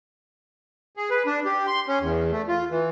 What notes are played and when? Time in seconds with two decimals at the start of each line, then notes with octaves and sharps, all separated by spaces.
0.97 G#4
1.10 B4
1.26 D4
1.45 G4
1.67 C6
1.88 C#4
2.01 E2
2.32 A3
2.48 F4
2.70 E3